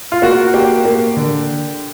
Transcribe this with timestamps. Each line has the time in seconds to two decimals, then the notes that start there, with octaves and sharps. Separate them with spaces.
0.12 F4
0.22 A#3 F#4
0.54 A#3 G4
0.85 A#3
1.17 D3